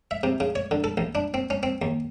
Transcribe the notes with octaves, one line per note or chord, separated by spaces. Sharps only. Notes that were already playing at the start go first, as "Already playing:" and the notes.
E5
C3
C#3
C#5
D3
A4
A1
D4
C4
C#4
C4
D#2